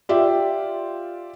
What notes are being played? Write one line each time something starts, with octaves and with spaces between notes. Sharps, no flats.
F4 G4 D5 E5 G5